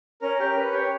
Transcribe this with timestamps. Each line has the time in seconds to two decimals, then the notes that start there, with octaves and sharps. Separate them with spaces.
0.21 C#4 A#4
0.40 G4 A#4
0.57 C#4 B4
0.73 G4 C#5